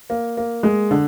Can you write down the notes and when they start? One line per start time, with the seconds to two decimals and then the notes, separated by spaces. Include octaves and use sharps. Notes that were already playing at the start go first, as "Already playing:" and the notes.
0.10 A#3
0.37 A#3
0.63 G#3
0.91 D3